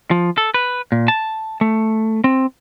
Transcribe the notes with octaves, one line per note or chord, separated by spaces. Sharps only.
F3
A4
B4
A#2
A5
A3
C4